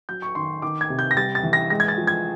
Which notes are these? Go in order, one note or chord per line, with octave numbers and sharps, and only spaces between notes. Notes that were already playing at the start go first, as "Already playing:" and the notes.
F#3 G6
C#6
D#3 C6
D#3 D6
G#6
C3
G6
A#6
G3 A6
A6
E3
A#6
G#3 A#6
G#6
A6
F3
G#6